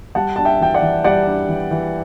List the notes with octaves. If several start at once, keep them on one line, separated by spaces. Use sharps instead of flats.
G3 F#5 A5
D4 A5
E5 G5
E3 G5
D5 F#5
E3
G3 D5 F#5
D4
E3
E3